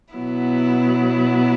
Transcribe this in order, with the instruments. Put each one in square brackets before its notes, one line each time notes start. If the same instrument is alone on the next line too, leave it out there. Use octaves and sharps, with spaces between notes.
[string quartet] B2 F#3 B3 E4